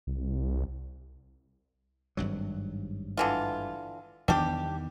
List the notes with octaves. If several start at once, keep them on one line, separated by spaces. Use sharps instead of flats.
C2
G#1 G2 F#3
D3 E3 F4
E2 D#3 G3 B3 D4 G4